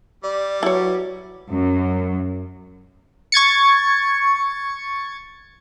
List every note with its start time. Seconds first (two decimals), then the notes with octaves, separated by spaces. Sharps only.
0.24 G3 D5
0.63 F#3 E4 B4 C#5
1.49 F#2
3.32 C#6 G#6 A6 C#7